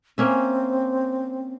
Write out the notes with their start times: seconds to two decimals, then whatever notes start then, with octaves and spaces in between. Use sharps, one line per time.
0.18 A#3 C4 C#4 E5